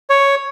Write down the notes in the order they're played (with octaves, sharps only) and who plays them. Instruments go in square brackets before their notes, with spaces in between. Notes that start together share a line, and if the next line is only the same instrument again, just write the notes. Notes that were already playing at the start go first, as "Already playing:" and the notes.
[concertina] C#5